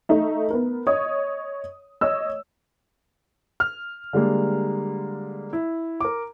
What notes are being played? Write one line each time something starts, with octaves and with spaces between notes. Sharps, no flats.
A3 D#4 E5
B3 A#4
C#5 D#5 D#6
C#5 D#5 E6
F6
D3 G3 G#3 A#3
E4
A#4 D6